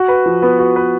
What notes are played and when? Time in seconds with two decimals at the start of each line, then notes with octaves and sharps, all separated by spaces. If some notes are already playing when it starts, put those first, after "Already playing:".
Already playing: F#4
0.08 B4
0.26 F3
0.42 B3
0.59 F#4
0.76 B4